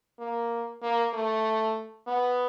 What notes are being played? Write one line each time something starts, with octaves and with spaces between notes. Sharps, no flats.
A#3
A#3
A3
B3